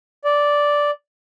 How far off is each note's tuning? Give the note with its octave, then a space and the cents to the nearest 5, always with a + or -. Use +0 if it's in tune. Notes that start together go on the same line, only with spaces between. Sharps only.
D5 -5